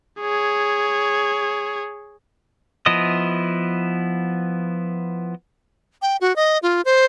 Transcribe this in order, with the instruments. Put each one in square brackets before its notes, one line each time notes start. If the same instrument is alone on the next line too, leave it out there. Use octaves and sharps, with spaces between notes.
[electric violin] G#4 C#5
[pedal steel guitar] F3 B3 E4 D#5 D#6
[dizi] G5
F#4
D#5
F4
C5